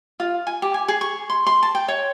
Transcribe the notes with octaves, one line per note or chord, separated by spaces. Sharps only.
F4
G#5
G4
G#5
G#4
C#6
C6
C6
A5
G5
C#5